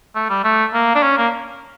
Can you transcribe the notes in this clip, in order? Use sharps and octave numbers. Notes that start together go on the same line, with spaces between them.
A3
G3
A3
A#3
D4
C#4
A#3